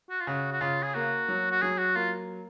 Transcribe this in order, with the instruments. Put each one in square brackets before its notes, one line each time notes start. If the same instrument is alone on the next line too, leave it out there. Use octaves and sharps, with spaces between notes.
[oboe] F#4
F4
[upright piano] C#3 [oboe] F#4
[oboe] F#4
[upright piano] C#3 [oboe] F4
[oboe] G#4
[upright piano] A#3 [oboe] F#4
[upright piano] F#3
[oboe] F#4
[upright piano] F#3 [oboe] G#4
[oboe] F#4
[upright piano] A#3 [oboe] F4